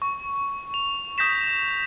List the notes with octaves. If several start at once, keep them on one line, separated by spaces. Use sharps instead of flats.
C#6
F7
D#6 G6 A#6 B6 E7